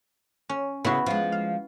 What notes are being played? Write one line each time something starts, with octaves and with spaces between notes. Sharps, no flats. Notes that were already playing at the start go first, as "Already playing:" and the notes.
C#4
C#3 B3 E4 F#4
F3 G#3
F5